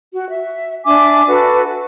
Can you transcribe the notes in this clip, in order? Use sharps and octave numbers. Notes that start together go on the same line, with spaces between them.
F#4
E5
D4 E5 G#5 D6
F#4 A4 B4